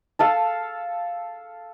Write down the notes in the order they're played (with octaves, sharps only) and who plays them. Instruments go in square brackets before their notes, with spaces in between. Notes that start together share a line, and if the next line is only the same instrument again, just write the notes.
[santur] A4 F5 A5